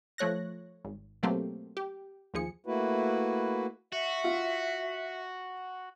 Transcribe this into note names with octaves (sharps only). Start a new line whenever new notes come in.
F3 A3 C#5 F#6 A#6
G#1
B2 F#3 A3 A#3 C4 G4
G4
D#2 F3 G#4 C#7
A3 A#3 E4 F#4 B4
F#4 E5
F4